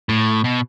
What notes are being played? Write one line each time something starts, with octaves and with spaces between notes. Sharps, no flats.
A2
B2